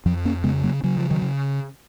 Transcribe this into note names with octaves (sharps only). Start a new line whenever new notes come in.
F2 F3
A#3 C#4
C#3 G#3 B3
F#3 A#3
C#3 F#3
F3
D#3 F#3
C#3